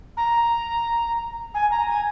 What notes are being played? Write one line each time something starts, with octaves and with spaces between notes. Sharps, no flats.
A#5
G#5
A#5
G#5